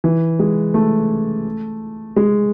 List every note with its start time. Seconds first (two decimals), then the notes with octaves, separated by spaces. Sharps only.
0.04 E3
0.39 G#3
0.74 A3
2.16 G#3